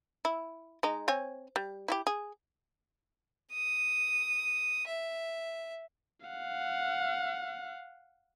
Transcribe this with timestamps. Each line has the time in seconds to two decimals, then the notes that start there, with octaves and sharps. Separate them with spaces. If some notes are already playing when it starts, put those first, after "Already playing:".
0.25 E4
0.83 G#3 D#4
1.08 C4 C#5 G#5
1.56 G3
1.88 E4 F#4 G4
2.07 G#4
3.53 D#6
4.87 E5
6.27 F5 F#5